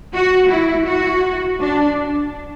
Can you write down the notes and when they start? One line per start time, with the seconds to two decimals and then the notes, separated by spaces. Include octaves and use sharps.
0.14 F#4
0.51 E4
0.86 F#4
1.60 D4